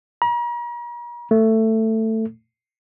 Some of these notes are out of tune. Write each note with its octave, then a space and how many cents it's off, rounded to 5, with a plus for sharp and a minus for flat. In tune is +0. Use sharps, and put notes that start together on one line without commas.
A#5 +45
A3 +15